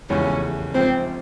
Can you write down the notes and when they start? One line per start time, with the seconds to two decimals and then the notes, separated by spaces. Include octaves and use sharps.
0.10 F1 E2 C#3 E3 G#3 C#4
0.74 A#1 G#2 F3 C4